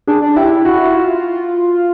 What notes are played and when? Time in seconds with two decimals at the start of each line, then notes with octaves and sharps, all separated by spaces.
0.07 D4 G#4
0.22 D4
0.36 E4 G4
0.65 F#4
0.95 F4